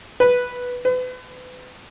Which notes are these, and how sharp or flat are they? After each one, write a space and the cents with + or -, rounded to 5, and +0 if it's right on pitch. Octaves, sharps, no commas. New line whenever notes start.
B4 -5
B4 +35